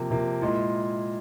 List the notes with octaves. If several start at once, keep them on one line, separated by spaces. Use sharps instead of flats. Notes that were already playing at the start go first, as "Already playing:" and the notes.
Already playing: C3 F3 A#3
C3 F3 A#3
A#2 G#3 E4